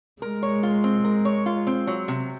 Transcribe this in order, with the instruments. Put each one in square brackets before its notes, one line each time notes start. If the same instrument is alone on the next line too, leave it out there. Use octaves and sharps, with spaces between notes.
[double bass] G#3 [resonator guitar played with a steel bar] A#4
[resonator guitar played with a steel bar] C#5
F4
C4
A#4
C#5
F4
C4
F#3
C3